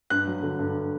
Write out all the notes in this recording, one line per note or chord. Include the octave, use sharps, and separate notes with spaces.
G2 F#6
F#3
D3
G2